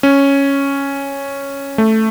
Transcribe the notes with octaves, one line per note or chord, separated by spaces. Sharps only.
C#4
A3